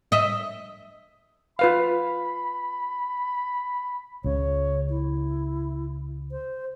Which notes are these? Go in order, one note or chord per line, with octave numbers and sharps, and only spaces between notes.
D#5 E5
F4 B4 F5 B5
C#2 C#3 C#5
E4
C5